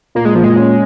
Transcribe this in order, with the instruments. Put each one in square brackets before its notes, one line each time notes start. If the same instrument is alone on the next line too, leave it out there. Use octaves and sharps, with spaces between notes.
[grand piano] A#2 [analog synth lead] A#3
[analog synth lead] G#3
[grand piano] A#2 [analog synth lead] F3
[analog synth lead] G#3
[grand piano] C#4